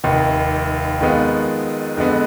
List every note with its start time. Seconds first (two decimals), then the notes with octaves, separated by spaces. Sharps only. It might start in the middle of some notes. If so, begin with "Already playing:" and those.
0.04 F1 D#2 D#3
1.01 F2 D#3 G#3 B3 F4
1.97 F2 D3 G#3 B3